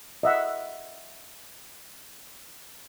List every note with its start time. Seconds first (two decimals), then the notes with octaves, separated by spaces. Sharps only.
0.23 D#5 E5 F#5